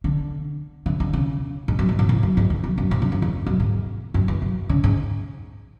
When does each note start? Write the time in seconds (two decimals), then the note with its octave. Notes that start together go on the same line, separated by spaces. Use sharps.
0.04 D3
0.86 D3
1.00 D3
1.13 C#3
1.68 G#2
1.79 F#2
1.89 G#2
1.99 A2
2.09 A2
2.23 F#2
2.37 G#2
2.50 E2
2.64 F#2
2.78 F#2
2.91 A2
3.02 D3
3.12 F#2
3.22 E2
3.46 F#2
3.60 G#2
4.14 F#2
4.28 E2
4.42 F#2
4.69 C#3
4.84 G#2